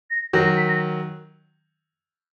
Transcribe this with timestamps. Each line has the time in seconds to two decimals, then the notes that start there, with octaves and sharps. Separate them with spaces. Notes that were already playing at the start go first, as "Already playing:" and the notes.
0.11 A#6
0.33 D#3 F#3 A#6
0.45 A#6
0.57 B6
0.68 A#6